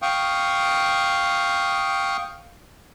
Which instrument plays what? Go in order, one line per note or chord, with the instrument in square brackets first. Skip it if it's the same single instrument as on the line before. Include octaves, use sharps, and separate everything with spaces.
[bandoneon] F5 G5 C#6 D#6